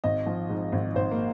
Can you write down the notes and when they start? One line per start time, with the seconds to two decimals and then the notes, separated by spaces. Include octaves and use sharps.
0.04 G#1 D#5
0.26 F3
0.49 G#2
0.72 G#1
0.95 G#1 C5
1.11 A#3